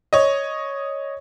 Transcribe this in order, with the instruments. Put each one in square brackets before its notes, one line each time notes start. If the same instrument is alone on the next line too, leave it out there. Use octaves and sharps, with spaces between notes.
[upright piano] C#5 D#5